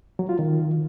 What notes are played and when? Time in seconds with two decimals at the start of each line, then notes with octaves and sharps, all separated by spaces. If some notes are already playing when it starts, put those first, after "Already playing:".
0.19 F#3
0.29 F4
0.39 D#3